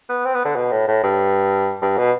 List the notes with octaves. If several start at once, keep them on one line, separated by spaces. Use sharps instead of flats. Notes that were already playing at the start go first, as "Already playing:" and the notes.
B3
C4
B3
D3
B2
A2
A2
G2
G2
B2